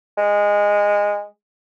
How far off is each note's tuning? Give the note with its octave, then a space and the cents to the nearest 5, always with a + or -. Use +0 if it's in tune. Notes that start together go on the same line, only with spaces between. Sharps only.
G#3 -15